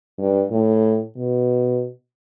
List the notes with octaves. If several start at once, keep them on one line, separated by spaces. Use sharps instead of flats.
G2
A2
B2